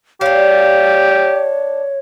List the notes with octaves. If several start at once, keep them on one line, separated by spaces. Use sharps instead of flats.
D4 G4 C#5 F5